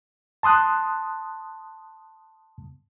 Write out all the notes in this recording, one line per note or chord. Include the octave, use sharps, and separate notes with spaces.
A5 C6 D#6 F#6